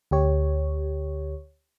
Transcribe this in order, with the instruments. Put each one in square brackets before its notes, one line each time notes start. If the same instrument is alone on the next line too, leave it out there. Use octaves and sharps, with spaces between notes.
[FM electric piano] D2 G4 C#5